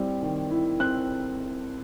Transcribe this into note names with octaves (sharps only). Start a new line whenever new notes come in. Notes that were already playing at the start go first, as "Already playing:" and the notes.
Already playing: G3 C4 E4
D#3
E4
C4 F#6